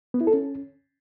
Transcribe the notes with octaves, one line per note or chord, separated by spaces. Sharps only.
B3
E4
A4
C#4